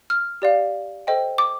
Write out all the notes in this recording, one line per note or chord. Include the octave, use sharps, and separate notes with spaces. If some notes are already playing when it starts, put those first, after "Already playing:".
F6
G4 D5 F5
A4 C5 D#5 G5
D6